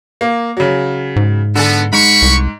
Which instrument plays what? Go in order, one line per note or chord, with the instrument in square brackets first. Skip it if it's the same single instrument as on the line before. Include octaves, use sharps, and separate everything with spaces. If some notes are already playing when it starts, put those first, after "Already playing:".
[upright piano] A#3
C#3 F#3
[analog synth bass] G#2
[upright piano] D3 A4 [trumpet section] B3
[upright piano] G#2 [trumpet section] B5 C#6
[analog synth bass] C2